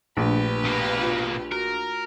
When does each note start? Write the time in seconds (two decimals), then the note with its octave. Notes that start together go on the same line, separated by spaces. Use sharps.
0.17 A#1 A3 D4 G4 B4
0.64 B2 A#3
1.00 F4
1.51 F#4 A#4